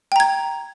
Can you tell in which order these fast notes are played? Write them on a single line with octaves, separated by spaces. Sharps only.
G5 A#5 G#6